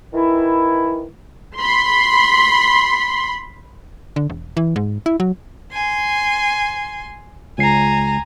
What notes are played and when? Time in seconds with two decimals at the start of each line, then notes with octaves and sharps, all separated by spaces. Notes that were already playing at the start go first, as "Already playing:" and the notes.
0.13 D#3 E3 E4
1.56 B5 C6
4.16 D3
4.30 E1
4.57 E3
4.76 G#2
5.06 E4
5.20 F#3
5.73 G#5 C6
7.58 C#2 G#5 A#5 C7